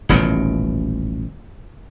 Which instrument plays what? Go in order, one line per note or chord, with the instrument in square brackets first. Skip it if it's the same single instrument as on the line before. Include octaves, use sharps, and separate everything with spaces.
[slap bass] D#1 A1 D#2 B2